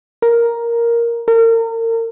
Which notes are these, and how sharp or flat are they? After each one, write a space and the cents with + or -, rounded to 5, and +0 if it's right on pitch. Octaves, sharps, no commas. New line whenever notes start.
A#4 +5
A#4 -35